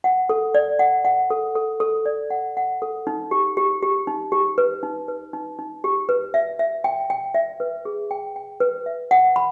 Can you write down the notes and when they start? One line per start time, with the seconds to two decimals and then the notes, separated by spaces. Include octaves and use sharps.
0.04 F#5
0.29 A4
0.55 D5
0.79 F#5
1.05 F#5
1.30 A4
1.55 A4
1.80 A4
2.06 D5
2.30 F#5
2.57 F#5
2.82 A4
3.07 D#4
3.31 G4
3.57 G4
3.82 G4
4.07 D#4
4.32 G4
4.58 B4
4.83 D#4
5.08 B4
5.33 D#4
5.59 D#4
5.84 G4
6.09 B4
6.34 E5
6.59 E5
6.84 G5
7.10 G5
7.35 E5
7.60 B4
7.85 G#4
8.11 G5
8.36 G5
8.60 B4
8.86 E5
9.11 F#5
9.36 B5